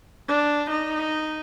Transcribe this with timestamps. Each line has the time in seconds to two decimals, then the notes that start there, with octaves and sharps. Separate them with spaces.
0.29 D4
0.70 D#4